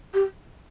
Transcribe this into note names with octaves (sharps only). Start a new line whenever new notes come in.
G4